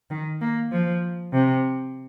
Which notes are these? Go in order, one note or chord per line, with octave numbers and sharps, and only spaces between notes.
D#3
A#3
F3
C3